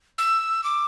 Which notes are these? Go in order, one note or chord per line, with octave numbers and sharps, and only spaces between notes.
E6
D6